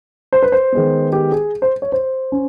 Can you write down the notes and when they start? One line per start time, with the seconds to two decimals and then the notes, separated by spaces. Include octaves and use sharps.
0.33 C5
0.43 B4
0.52 C5
0.72 D#3 G#3 B3
1.13 G4
1.32 G#4
1.62 C5
1.82 C#5
1.92 C5
2.32 C#4